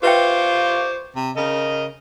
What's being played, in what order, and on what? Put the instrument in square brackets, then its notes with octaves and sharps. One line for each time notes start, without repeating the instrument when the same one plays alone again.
[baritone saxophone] F4 [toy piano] B4 E5 G5 [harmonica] C5 C#6 D6
[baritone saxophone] C3
[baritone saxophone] C#3 [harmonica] A#4 D#5